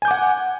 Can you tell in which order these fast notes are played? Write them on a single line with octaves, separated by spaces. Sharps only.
G#5 G6 D6 F#5